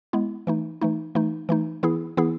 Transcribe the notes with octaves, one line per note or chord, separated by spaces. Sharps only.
G#3 B3 E4
E3 A3 D#4
E3 A3 D#4
E3 A3 D#4
E3 A3 D#4
E3 B3 E4 G#4
E3 B3 E4 G#4